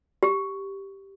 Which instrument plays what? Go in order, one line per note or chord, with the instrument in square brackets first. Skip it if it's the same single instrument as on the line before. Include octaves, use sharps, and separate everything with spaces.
[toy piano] G4